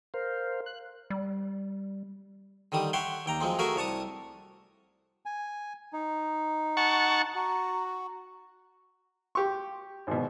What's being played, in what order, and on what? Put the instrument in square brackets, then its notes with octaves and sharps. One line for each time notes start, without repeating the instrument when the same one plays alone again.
[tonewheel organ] A#4 C5 F5
F#6
[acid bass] G3
[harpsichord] D3 D#3 G3 D#6
C#5 E5 F#5 G5 C6
D#2 G5 A#5
F#2 F3 G#3 C4
A3 F#4 G#4 A#4 E5 G#5
C2 C#5 A5 C#6 D#6
[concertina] G#5
D#4
[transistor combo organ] F#5 A5 C#6
[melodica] F#4 [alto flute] A#5
[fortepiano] G4 C#6
G#1 B2